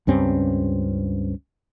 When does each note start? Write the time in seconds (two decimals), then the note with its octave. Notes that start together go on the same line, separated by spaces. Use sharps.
0.07 C#2 G2 C4 C#4